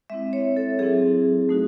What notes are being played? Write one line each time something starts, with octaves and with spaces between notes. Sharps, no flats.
G#3 C4 E4 E5
C#5
A4
F#3 C4 E4 G#4
A3 D#4 F#4